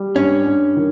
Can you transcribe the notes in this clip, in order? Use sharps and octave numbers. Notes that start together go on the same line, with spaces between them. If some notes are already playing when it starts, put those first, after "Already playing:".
Already playing: G3
G2 C#4
G2
D#3